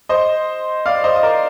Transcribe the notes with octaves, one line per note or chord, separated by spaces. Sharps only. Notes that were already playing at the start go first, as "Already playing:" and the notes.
C5 D#5
D5 F5
C5 D#5
D#5
A#4 D5